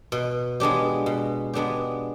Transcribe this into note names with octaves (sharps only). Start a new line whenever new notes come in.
B2
G#3 B3 D4 G4
B2
G#3 B3 D4 G4